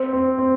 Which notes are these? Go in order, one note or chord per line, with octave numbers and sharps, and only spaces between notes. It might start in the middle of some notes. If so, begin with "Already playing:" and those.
Already playing: C4
C4
C4